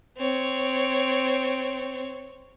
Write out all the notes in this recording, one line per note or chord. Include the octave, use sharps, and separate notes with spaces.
C4 C#5